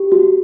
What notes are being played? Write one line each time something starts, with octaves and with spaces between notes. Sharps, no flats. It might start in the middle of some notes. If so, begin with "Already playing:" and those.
Already playing: G4
F#4